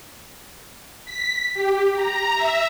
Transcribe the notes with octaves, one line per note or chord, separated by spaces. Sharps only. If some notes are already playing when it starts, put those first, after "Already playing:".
B6
G4
A#5
E5